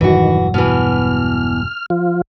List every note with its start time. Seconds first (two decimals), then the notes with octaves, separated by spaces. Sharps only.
0.01 E1 G2 D#3 E3 F#3 F#4
0.54 B2 E3 F6
1.90 F3 F4